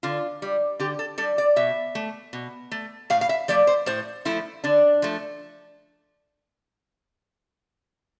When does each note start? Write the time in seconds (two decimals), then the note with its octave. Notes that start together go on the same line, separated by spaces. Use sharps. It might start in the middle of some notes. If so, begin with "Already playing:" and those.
0.03 D3 F4
0.42 G3
0.80 D3 G4
0.99 A4
1.18 G3 A4
1.38 D5
1.56 B2 E5
1.95 A3
2.33 B2
2.71 A3
3.10 A2 F5
3.21 F5
3.29 E5
3.48 F3 A3 D5
3.67 C5
3.86 A2 C5
4.25 F3 A3 E4
4.64 D3 D4
5.02 F3 A3